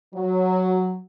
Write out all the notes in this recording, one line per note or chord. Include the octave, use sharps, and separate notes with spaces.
F#3